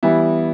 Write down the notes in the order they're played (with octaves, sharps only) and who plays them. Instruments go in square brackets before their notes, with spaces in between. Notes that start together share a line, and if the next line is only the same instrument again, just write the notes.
[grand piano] E3 G3 B3 E4